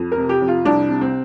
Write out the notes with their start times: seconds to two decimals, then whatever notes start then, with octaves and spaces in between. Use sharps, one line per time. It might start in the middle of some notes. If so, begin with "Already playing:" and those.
Already playing: F2
0.12 A#4
0.17 C3
0.29 G4
0.41 F2
0.48 F4
0.65 C2 D4
0.89 C3
1.01 C4